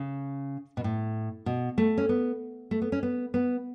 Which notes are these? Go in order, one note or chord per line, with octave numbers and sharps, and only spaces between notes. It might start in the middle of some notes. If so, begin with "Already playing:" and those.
Already playing: C#3
B2
A2
B2
A3
C#4
B3
A3
B3
C#4
B3
B3